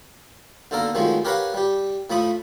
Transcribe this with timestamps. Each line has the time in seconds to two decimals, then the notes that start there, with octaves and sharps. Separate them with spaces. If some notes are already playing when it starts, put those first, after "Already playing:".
0.71 B1 D3 A#3 A4 A#4
0.95 C2 D#3 F3 F#3 G#3 A3
1.25 G4 A#4 B4 C#5 F5 F#5
1.54 G3 G4
2.10 A2 F3 A3 B5 D#6